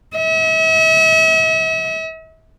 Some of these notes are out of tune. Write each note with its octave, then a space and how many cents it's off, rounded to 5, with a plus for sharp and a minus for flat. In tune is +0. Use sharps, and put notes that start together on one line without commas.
E5 -45